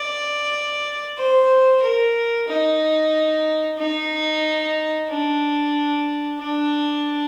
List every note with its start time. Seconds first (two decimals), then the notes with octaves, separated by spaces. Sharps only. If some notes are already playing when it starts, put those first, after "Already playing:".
Already playing: D5
1.18 C5
1.83 A#4
2.48 D#4
3.78 D#4
5.09 D4
6.39 D4